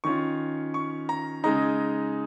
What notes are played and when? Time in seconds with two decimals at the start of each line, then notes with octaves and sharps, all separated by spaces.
0.04 D#3 C#4 F4 C#6
0.74 C#6
1.09 A#5
1.44 C#3 G#3 D#4 A#5